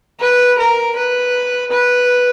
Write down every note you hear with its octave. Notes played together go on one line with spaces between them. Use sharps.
B4
A#4
B4
B4